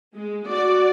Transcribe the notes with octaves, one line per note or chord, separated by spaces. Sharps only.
G#3
F#4 D5